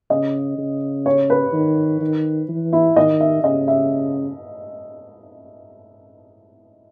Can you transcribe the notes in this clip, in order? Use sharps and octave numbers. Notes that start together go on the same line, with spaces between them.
C#3 D#5
C#3
C#5
B4
D#3
D#3
E3
E4
D#3 D#5
E5
C#3 D#5
E5